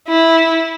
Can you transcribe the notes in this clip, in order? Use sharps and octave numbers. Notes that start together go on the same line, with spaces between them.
E4